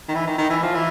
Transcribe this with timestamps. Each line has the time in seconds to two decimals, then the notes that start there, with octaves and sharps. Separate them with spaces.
0.09 D#3
0.15 E3
0.27 D#3
0.39 D#3
0.50 E3
0.63 F3
0.74 E3